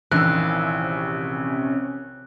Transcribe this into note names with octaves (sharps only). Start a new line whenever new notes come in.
A#1 C3 D#3 E3 C#4 F5 E6 F#6